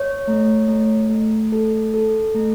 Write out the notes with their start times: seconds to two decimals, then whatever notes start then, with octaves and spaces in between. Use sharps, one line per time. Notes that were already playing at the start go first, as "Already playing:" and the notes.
Already playing: C#5
0.28 A3
0.68 A3
1.10 A3
1.52 A4
1.94 A4
2.35 A3